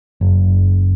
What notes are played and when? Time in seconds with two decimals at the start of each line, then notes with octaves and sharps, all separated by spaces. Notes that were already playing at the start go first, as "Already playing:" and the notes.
0.21 F#1